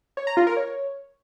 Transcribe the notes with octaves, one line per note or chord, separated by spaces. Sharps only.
C#5
A#5
F4
A#4
C#5